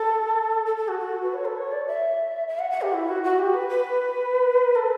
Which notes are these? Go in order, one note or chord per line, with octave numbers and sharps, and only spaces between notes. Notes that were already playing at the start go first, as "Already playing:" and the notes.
Already playing: A4
A4
A4
F#4
F#4
B4
C#5
A4
C#5
D5
E5
E5
F#5
F#5
G4
E4
F#4
F#4
G4
B4
B4
A4